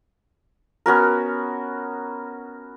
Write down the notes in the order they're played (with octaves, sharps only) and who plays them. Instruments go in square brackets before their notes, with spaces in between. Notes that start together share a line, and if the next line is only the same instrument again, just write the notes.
[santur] B3 C#4 F#4 A#4